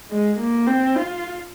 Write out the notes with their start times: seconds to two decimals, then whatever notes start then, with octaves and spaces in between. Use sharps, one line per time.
0.10 G#3
0.39 A#3
0.67 C4
0.96 F4